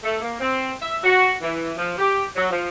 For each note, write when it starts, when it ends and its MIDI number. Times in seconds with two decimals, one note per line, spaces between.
0.04 0.18 57
0.21 0.36 58
0.40 0.71 60
0.82 0.98 76
1.04 1.32 66
1.42 1.72 52
1.77 1.94 53
1.98 2.25 67
2.36 2.49 54
2.50 2.69 53